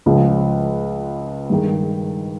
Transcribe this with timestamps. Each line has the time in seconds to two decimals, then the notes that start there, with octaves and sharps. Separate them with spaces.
0.06 C#2 C#3 F3 G#3
1.50 G2 D#3 G#3